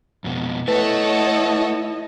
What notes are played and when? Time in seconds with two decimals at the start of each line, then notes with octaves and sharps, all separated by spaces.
0.24 F2 B2
0.68 A3 E4 A4 B4 C#5 D#5 F#5